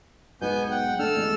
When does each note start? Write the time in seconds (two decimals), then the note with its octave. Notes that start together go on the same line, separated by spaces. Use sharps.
0.42 B1 G#2 B2 B3 G#5 G6
0.71 F#5 G5
0.99 A3 D4 A4 E6 F6
1.15 A1 E2 G#3